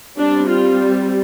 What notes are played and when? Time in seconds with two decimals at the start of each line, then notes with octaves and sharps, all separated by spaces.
0.18 G3 C4 D4
0.48 F4